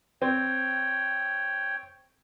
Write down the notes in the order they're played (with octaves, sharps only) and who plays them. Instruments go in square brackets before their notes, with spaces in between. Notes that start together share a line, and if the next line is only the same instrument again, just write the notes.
[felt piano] C4 [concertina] C#5 G5